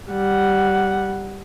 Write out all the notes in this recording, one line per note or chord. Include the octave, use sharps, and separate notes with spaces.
G3 F#5